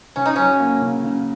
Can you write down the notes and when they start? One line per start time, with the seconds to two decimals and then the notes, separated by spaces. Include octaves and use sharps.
0.16 C#3 C#4
0.26 D#4
0.36 F#3 C#4
0.59 A#3
0.82 C#3
1.03 C#3